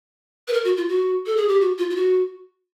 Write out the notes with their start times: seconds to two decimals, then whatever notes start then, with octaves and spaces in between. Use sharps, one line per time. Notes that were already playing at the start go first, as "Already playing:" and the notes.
0.48 B4
0.53 A#4
0.64 F#4
0.77 F4
0.89 F#4
1.26 A4
1.37 G#4
1.48 G4
1.61 F#4
1.78 F4
1.90 F4
1.96 F#4